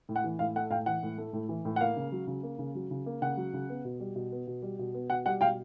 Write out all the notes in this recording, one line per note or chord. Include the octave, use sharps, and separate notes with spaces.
A2
F#5
E3
A2 F5
A3 F#5
A2 F5 G5
E3 F#5
A2
A3
A2
E3
A2
F#5
A#3 F5
C#3
F#3
C#3
A#3
C#3
F#3
C#3
A#3
C#3 F#5
F#3
C#3
B3
B2
G3
B2
B3
B2
G3
B2
B3
B2 F#5
G3 F#5
B2 F5 G5